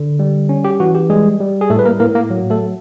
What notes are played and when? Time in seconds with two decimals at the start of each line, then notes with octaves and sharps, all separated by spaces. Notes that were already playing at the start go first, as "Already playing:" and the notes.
Already playing: D3
0.19 G3
0.49 C#4
0.64 G4
0.80 E3 F#4
0.95 G4
1.09 G3 G#3 G#4
1.40 G3
1.61 G#4
1.70 A2 A3 A4
1.79 B4
1.85 A#3 A#4
2.00 A2 A#3 A#4
2.15 A#3 A#4
2.30 F#3
2.50 A3 A4